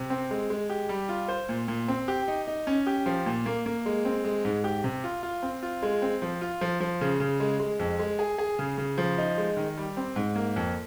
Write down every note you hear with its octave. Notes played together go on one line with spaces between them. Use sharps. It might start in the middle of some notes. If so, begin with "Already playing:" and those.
Already playing: C3
C4
G#3
G#3
G4
G3
F4
C5
A#2
A#2
C4
G4
D#4
D#4
C#4
G4
F3
A#2
A#3
A#3
G#3
C4
G#3
G#2
G4
C3
F4
F4
C4
F4
G#3
C4
F3
F4
F3
F3
C#3
C#3
G#3
G#3
F2
G#3
G#4
G#4
C#3
C#3
F3
D#4
G#3
D#3
G3
C4
G#2
A#3
F2